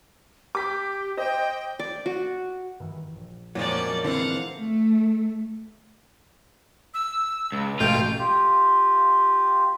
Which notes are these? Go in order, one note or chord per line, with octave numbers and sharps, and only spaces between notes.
G4 D6 B6
C5 D#5 G5
D5
F#4
G2 D#3 E3
A#1
F2 A#2 F3 F#3 G#3 C#4 D5
D3 E3 C4 F5 F#5
A3
E6
C#2
A1 G#2 B2 A3 F4 G5 G6
F4 G4